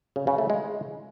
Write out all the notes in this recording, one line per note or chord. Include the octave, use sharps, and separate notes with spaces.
C#3
C#3
A3
G#3